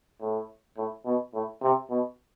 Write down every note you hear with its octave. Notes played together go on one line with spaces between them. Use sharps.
A2
A2
B2
A2
C3
B2